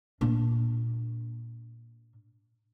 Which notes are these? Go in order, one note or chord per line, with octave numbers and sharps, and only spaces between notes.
A#2 D4